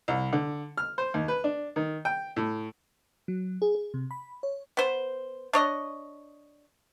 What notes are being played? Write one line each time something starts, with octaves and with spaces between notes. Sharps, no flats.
C2
D3
F6
C5
D#2
B4
D4
D#3
G5
A2
F#3
G#4
G#4
C3
B5
C#5
B3 C5
D4 C#5 D#5